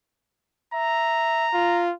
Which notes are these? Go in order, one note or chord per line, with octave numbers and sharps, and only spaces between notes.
E5 A#5
F4